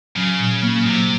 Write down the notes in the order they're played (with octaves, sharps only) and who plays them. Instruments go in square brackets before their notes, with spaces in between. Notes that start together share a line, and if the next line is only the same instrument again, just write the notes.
[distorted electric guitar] C#3 [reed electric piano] F#3
[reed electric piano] A#2
A#3
[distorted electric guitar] C3 [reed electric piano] F#3